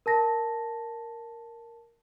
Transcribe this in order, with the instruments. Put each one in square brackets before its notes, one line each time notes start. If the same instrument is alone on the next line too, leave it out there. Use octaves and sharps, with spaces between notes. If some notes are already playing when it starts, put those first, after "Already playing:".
[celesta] A#4 A5 A#6